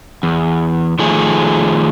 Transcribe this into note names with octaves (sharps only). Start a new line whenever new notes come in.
E2
D#3 F3 A3 G#4